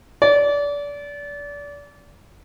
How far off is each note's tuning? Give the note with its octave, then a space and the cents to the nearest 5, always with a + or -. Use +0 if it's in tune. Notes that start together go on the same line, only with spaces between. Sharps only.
D5 -30